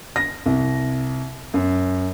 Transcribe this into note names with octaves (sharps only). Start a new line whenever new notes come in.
A#6
C2
F#2